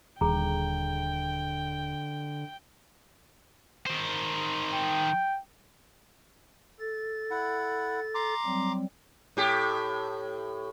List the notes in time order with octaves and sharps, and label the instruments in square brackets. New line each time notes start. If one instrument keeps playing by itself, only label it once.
[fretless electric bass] D#1 [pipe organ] D3 [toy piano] G#4 A#5 [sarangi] G5
[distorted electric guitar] D#3 C5
[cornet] G5
[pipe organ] A4 A6
[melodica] E4 F#5
A#5 C6 D6
[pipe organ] F#3 G3 C4
[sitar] A2 G4